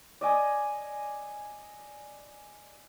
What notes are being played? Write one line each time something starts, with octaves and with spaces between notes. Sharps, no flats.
D5 D#5 G#5 D#6